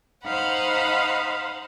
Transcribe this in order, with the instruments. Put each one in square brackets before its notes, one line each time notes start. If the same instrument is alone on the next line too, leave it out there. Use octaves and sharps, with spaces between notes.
[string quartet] D#4 C5 F5 F#5 B5